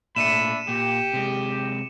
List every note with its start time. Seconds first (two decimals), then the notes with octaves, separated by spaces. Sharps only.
0.16 A#2 A3 D4 E5 B5 C#7 D#7 E7
0.69 A#2 G4
1.14 C3 G#3